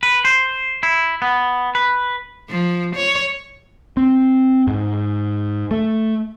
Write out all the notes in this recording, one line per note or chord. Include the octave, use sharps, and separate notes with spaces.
B4
C5
E4
B3
B4
F3
C#5
C4
G#2
A3